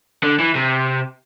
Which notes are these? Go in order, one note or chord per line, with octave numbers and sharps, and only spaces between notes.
D3
E3
C3